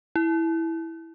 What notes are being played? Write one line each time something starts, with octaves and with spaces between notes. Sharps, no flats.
E4